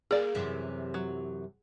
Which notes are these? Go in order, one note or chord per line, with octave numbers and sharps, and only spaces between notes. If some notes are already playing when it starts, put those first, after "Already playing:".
A#3 G#4 A#4 D5
F#2 C3 E3
F#3